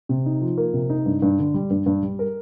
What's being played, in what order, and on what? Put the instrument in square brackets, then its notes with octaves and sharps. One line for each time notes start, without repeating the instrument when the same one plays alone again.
[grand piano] C3
D#4
F3
A#3
C3
D#4
G2
G2
D3
G3
G2
G2
G3
A#4